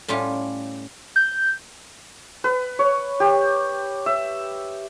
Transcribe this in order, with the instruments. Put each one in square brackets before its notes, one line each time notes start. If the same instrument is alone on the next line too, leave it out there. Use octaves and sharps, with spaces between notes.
[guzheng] A2 G3 C#4 F4 G4
[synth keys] G6
[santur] B4
C#5
G4
E5